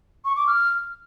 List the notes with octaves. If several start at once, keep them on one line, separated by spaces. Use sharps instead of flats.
C#6
D6
F6